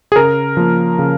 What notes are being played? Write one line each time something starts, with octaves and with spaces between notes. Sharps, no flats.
G#4
C#3 A#4
F3 A#3
C#3